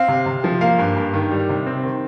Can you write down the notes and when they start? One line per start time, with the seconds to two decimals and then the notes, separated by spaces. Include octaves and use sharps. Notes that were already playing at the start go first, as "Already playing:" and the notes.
Already playing: C4 F5
0.08 C3
0.26 C3
0.44 F3
0.61 A#3 F5
0.78 G2
0.96 G2
1.13 D#3
1.31 G3
1.49 C3
1.66 C4
1.83 D#3